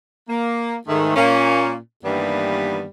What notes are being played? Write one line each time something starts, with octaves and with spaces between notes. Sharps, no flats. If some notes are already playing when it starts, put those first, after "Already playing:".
A#3
G#2 D#3 A3
A#2 A#3 C#4
G2 D#3 E3 G3 A#3 B3